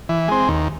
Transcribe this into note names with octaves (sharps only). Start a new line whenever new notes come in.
E3
G#3 C4
D#2